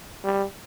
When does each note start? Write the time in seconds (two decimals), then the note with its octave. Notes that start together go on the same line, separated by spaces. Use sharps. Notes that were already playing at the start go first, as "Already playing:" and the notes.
0.24 G3